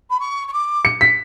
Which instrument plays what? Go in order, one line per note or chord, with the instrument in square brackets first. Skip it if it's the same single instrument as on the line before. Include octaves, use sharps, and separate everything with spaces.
[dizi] B5
C#6
C#6
D6
[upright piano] C#7
B6